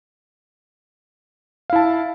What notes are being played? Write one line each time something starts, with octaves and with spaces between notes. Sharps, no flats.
E4 F5 A5